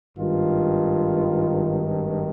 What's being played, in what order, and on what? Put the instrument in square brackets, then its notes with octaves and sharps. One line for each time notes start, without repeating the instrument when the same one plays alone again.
[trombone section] G#1 G2 D#3 F4